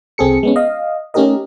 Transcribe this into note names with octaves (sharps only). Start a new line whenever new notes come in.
C2 C4 G#4 A4 C#7
G#3 B3 C#4
D#5 F5
A3 C#4 D#4 G4 A#4 D#5